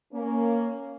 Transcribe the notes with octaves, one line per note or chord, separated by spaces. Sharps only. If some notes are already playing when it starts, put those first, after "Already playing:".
A#3 C#4